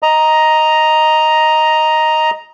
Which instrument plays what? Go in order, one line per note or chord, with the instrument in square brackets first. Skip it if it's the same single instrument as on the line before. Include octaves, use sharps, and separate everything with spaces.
[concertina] D#5 A#5